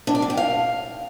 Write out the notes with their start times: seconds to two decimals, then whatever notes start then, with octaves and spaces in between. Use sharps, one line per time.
0.07 D4
0.15 D5
0.22 D4
0.30 G5
0.37 F5